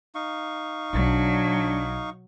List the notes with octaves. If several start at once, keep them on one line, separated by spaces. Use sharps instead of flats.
D#4 F5 C#6
B1 F#3 D4